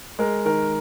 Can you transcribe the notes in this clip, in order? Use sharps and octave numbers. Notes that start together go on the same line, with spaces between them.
G#3 A#4
D#3 A#4